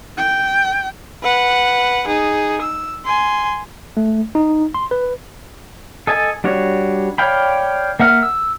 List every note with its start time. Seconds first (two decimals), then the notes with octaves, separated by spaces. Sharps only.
0.18 G5
1.23 B4 F#5
2.07 D#4 G#4
2.61 E6
3.05 G#5 C6
3.97 A3
4.35 D#4
4.74 C6
4.91 B4
6.07 A4 D#5 G#5 A5
6.44 G3 D4 F#4 C#5
7.18 C#5 D5 F5 G5 B5
8.00 A#3 E5 F#5 F6
8.23 E6